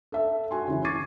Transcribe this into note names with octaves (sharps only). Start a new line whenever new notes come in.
A4 E5
F#4 G#5 C6
C#3 E3
C#6 D6 G#6 A6 C7 D#7